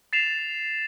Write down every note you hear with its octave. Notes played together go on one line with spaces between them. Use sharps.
A6 C7 E7 F7